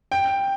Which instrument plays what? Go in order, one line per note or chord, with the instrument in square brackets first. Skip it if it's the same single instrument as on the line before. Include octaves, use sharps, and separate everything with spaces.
[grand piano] G5